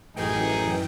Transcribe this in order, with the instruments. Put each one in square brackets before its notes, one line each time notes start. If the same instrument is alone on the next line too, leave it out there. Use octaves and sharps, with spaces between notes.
[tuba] A1 [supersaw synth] F#2 E3 G5 [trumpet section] D#4 G#4